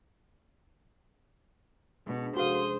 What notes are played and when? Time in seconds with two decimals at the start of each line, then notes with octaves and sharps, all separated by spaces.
2.06 B2 G#3 C#4 D4
2.36 F1 F#4 G#4 A#4 C5 F5 C6 D#6